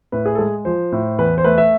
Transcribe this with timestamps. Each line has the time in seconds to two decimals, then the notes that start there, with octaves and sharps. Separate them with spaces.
0.12 A2 B4
0.26 G#4
0.35 A4
0.39 G#3 G#4
0.65 F3 C5
0.92 A2
1.18 E2 B4
1.38 C5
1.44 A3 B4
1.58 E5